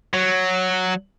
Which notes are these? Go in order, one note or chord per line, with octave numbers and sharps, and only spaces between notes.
F#3